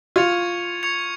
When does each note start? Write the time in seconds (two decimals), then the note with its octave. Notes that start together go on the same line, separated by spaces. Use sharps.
0.16 F4 C#6 G#6 C#7 F7
0.83 C#6 G#6 C#7 F7